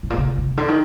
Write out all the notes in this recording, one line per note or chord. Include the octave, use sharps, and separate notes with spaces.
A2
A#2
C3
C3
D3
D#3